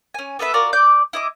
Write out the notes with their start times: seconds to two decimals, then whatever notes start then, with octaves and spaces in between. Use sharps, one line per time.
0.14 C#4 G#5
0.39 B3 A4 B4 E5
0.53 F4 F#4 A#4 D5
0.73 D5 D6 G6
1.13 E4 D#5 D6